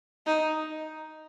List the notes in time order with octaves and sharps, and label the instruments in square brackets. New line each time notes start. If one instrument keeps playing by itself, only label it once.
[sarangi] D#4